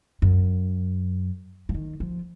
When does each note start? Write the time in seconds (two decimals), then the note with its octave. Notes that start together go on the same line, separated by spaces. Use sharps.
0.22 F#2
1.69 F3
1.74 D#3
2.00 F3